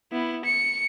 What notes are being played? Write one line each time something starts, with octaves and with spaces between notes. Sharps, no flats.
B3 E4
C#7